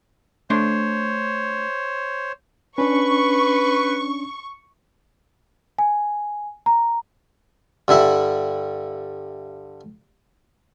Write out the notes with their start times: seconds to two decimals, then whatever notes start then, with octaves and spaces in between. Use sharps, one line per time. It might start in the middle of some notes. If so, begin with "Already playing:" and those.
0.50 A3 D4 C5 C#5 C6
2.78 C#4 D4 B4 C#6
5.78 G#5
6.66 A#5
7.88 G2 D3 E4 E5